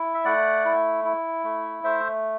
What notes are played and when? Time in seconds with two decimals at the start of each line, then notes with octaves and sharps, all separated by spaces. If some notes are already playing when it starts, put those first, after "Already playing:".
Already playing: E4
0.14 E5
0.25 A3 D5 F#5
0.65 E4
1.04 E4
1.44 A3
1.84 A3 C5 E5